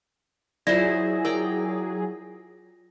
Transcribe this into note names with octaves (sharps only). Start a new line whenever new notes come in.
F#3 E4 F4 G#4 C5 D5 A#6
A#4 D5 G5 A#5